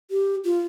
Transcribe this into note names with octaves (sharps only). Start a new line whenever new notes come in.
G4
F4